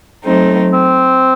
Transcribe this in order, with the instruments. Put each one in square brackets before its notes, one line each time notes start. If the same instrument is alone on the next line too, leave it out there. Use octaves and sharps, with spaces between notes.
[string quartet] F#3 A3 C4 D#4
[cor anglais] C4